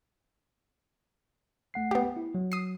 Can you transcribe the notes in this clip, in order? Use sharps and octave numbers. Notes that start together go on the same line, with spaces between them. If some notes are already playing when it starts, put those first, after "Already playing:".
A3 F#5 C7
B3 G4
E4
F#3
D#6 C7